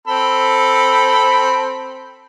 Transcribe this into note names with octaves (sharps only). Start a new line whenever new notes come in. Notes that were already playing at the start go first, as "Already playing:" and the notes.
C4 A4 B5